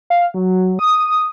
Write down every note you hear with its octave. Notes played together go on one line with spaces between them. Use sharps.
F5
F#3
D#6